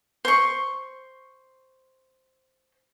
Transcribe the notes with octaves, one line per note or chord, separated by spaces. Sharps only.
C5 C#6